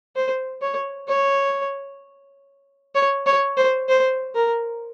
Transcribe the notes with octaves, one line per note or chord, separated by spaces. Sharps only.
C5
C#5
C#5
C#5
C#5
C5
C5
A#4